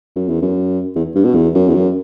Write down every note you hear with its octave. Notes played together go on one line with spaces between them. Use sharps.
F#2
E2
F#2
E2
G2
B2
E2
F#2
E2
F#2